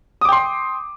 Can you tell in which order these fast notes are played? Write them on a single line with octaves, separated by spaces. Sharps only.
D#6 D6 G5 C6